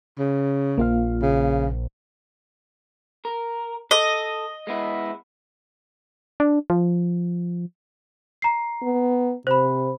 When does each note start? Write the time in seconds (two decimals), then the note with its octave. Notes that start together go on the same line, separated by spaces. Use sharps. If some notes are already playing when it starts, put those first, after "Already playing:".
0.19 C#3
0.78 A#1 A#3 F4 F5
1.22 C#3
3.25 A#4
3.91 A4 D#5
4.67 G#3 B3 E4
6.40 D4
6.70 F3
8.42 A#5 C7
8.82 B3
9.47 C3 C5 B5